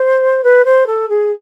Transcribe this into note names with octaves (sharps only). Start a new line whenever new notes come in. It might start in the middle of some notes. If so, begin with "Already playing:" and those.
Already playing: C5
B4
C5
A4
G#4